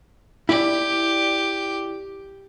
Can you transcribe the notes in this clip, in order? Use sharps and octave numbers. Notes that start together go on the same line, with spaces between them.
E4 G4 D5